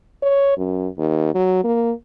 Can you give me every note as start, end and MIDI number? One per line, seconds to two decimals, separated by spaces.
0.22 0.56 73
0.57 0.87 42
0.98 1.32 39
1.34 1.60 54
1.64 1.92 58